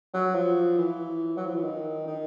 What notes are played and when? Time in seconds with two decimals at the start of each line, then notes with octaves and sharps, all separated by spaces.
0.14 F#3
0.35 F3
0.78 E3
1.37 F#3
1.46 F3
1.55 E3
1.63 D#3
2.07 D#3